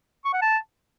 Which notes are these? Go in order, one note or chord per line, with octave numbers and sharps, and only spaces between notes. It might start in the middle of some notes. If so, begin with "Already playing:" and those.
C#6
F#5
A5